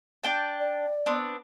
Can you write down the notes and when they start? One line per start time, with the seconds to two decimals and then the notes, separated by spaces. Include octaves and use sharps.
0.24 D4 G5 A5
0.60 D5
1.06 B3 C4 D4